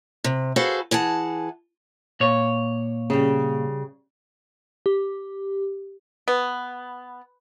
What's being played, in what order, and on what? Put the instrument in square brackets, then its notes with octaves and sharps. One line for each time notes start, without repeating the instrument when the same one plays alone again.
[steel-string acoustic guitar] C3
F#4 G#4 A4 B4 C5 F5
E3 G#4 F#5 A5
[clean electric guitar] A#2 C#5
[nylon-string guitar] C#3 G3
[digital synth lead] G4
[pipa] B3